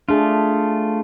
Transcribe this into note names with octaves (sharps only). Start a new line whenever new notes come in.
A3 D4 F4 G#4